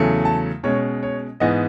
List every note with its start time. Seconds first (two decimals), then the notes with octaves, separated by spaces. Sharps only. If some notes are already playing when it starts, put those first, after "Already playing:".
Already playing: E2 C#3 F#3 A3
0.25 A5
0.63 B2 G#3 C#4 C#5
1.03 C#5
1.40 G#2 E3 B3 D#5